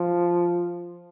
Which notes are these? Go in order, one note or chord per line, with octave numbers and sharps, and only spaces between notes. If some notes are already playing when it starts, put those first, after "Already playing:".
Already playing: F3